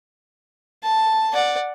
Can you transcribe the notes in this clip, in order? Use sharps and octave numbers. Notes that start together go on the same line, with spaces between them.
A5
D5 F#5